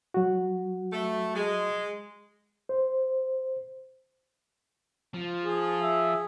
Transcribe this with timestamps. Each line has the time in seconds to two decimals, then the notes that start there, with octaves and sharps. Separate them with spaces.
0.14 F#3 F#4
0.91 A3
1.35 G#3
2.69 C5
5.14 F3
5.44 G#4
5.82 E5